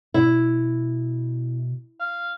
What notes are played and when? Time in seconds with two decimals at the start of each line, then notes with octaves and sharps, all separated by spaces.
0.14 B2 E4
2.00 F5